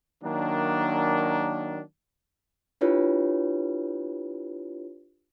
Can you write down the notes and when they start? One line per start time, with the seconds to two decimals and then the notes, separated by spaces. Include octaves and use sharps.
0.23 D#3 F#3 A#3 D4
2.81 D4 E4 F4 G4 B4 C#5